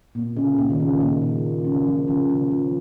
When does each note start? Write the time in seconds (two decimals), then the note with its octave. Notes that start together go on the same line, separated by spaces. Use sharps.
0.15 A#2
0.37 C#3
0.58 A#2
0.70 D#3
0.80 C#3
1.01 A#2
1.22 A#2
1.65 C#3
1.87 F3
2.08 C#3
2.30 C#3
2.51 F3